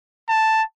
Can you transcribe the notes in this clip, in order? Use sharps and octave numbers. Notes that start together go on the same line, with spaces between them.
A5